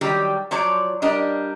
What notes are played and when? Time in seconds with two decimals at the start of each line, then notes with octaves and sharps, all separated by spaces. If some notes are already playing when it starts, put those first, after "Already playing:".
0.01 D#3 F#3 G3 G4
0.51 F3 F#3 C#5 D5
1.02 G3 D4 A#4 D#5